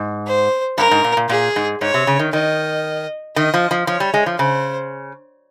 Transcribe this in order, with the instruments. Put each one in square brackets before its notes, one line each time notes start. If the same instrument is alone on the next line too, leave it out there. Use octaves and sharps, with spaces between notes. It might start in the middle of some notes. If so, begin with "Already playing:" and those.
Already playing: [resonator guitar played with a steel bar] G#2
[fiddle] C5
[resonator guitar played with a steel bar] G2 [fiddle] A#4
[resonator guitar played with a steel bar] G#2
A#2
A#2
[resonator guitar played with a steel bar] A#2 [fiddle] G#4
[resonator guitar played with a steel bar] G#2
[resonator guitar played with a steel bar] G#2 [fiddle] C#5
[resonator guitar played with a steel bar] C3
C#3
D#3
[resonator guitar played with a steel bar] D#3 [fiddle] D#5
[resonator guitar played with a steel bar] D#3 [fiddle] D#5
[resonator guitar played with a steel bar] F3
F3
[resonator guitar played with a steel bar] F3 [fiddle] C#5
[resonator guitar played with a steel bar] G3
G#3
F3
[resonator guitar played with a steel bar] C#3 [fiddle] C5